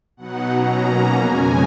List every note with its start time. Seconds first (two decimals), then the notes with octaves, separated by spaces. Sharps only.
0.17 B2 F#3 B3 D#4 F#5
0.50 B2 F#3 C#4 A#5
0.82 B2 A#3 C#4 A#5
1.16 F2 C#3 G#3 G#5